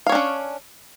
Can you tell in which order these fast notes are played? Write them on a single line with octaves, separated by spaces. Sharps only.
F5 C#5 D4 C#4